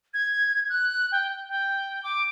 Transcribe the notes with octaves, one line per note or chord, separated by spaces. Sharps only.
G#6
F#6
G5
G5
D6